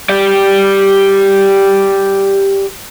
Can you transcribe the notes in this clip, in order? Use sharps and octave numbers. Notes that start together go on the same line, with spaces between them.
G4 D5